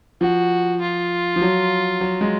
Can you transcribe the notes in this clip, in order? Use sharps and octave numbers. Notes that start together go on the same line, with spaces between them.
F3 F#4
F4
F3
F#3
F#3
G#3